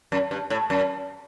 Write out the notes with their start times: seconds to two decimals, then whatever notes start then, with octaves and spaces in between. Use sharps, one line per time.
0.12 F#2
0.31 G2
0.50 A2
0.70 F#2